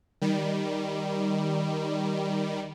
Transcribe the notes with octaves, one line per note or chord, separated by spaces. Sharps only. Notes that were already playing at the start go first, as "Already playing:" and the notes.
D#3 G3